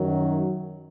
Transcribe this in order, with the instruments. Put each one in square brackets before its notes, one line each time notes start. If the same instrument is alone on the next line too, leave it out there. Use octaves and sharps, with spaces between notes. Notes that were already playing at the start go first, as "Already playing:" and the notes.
Already playing: [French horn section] F#2 D#3 F#3